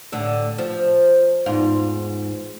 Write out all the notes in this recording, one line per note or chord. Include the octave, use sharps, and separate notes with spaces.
A2 D3 E5
F3
E2 G#2 F4